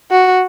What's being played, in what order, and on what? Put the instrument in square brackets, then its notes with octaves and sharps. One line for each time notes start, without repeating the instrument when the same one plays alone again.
[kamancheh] F#4